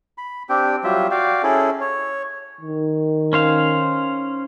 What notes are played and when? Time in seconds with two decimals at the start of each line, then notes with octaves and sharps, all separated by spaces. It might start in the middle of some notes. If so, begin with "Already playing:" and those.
0.18 B5
0.49 C4 D4 G4 G5
0.84 F#3 G3 F4 E5
1.11 F#4 D5 F5 G5
1.43 C#4 E4 G#4 A4
1.81 C#5
2.61 D#3
3.33 C#4 C5 F5